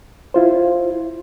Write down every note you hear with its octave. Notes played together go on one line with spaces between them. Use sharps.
E4 F4 C5